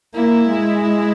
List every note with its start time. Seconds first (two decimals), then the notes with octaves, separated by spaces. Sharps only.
0.15 A#3 E4
0.48 G#3
0.83 E4